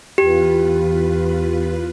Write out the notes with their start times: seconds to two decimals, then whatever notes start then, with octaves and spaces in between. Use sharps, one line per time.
0.18 E2 F4 G4 B4